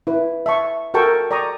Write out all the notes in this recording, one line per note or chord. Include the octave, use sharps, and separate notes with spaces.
E4 B4
E5 A5 C#6
F#4 A4 A#4 G5 A5 C#6
D5 G5 A#5 C#6 D#6